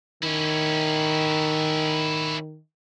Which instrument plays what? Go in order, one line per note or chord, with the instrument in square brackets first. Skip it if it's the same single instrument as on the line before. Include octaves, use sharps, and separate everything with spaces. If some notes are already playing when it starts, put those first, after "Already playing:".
[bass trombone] D#3 [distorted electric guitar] C#4 E4